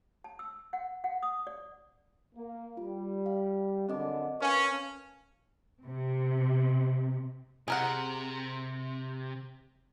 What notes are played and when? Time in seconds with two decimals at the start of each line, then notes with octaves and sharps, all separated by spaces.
0.24 A5
0.39 E6
0.73 F#5
1.04 F#5
1.23 D#6
1.47 D5
2.35 A#3
2.77 G3 F4
3.26 F5
3.89 F#2 D3 C4 D#5 D6
4.41 A#2 C#4 A#4 B4 F5 A5 C#6
5.84 C3
7.68 C3 G#4 A#4 F#5